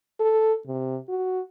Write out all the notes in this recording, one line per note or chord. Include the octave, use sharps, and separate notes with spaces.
A4
C3
F#4